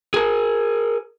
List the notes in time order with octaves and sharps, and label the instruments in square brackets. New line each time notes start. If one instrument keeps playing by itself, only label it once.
[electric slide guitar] G#4 A#4